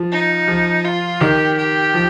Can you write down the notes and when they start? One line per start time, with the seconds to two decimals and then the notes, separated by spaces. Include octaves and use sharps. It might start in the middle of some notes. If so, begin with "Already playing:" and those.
Already playing: F3
0.12 D#4
0.48 F3
0.85 F4
1.21 D#3 G4
1.57 G4
1.94 F3